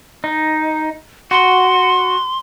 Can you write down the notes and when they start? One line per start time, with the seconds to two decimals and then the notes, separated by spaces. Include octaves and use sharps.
0.24 D#4
1.31 F#4 C6